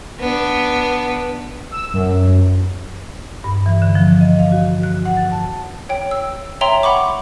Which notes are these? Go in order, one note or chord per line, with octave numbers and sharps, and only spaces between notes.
B3 D4
E6
F#2
G2
E3
D3
F3
D#5
F5
F#4
F#6
F#5
A6
A5
C#5 G5
E6
C#5 E5 G5 A#5 C6
F#5 B5 C#6 D6